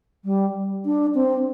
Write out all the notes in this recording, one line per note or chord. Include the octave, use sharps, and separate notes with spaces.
G3
D4
C4